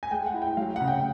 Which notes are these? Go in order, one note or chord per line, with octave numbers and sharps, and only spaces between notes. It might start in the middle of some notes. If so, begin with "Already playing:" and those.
G#5
G#3 G5
F#5
E4
G5
F#3 F5
C#3 F#5
G5